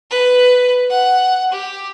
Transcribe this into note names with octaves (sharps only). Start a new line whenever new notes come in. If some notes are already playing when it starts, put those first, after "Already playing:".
B4
F#5
G4